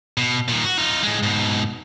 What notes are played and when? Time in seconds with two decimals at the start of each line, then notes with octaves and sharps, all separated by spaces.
0.18 B2
0.48 A#2 D#3
0.65 F#4
0.78 D#4 F4
1.03 A2 G#3
1.23 G#2 B2